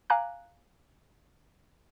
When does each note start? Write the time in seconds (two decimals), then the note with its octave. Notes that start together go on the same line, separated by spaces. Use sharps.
0.10 F5 G#5 A#5 D6 F#6